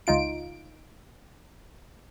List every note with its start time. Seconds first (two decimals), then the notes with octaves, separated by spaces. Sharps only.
0.07 C#2 D#4 F4 D7